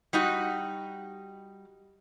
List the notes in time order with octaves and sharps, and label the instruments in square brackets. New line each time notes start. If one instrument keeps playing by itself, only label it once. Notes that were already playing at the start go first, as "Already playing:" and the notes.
[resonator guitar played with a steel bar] G3 D#4 F#4